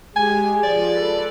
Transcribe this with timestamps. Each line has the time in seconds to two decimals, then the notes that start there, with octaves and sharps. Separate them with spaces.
0.16 G#3 G4 G#4 G#5
0.63 F3 D5
0.92 A4 B4